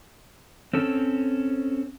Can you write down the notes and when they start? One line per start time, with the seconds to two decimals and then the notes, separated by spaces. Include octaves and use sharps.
0.73 C4 C#4 A4